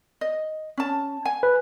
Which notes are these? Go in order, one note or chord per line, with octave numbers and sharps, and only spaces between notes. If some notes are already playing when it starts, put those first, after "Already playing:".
D#5
C#4 A5
G#5
B4